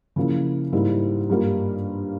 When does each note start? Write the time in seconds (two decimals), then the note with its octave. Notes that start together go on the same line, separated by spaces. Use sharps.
0.16 C#3 F3 A#3 E4
0.72 G#2 G3 A#3 E4
1.30 G2 G3 A#3 F4